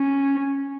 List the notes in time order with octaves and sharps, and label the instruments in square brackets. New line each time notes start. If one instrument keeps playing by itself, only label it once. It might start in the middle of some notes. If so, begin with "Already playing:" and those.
Already playing: [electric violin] C#4